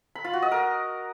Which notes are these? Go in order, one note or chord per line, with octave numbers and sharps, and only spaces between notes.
B5
F4
F#4
D#5
A#4